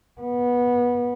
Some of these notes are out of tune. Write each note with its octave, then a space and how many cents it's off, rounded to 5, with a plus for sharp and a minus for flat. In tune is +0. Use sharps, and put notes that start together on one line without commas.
B3 -20